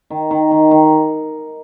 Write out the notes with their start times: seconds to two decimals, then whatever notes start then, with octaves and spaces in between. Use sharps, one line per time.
0.10 D#3
0.31 D#3
0.51 D#3
0.71 D#3